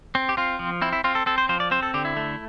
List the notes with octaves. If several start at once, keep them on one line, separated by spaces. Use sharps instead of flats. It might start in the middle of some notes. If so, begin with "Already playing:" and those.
C4
G4
C4 F4
F3
C4 E4
E4
C4 F4
A4
C4 A4
C5
F3 C5
D5
C4 C5
A4
D3 G4
E4
A3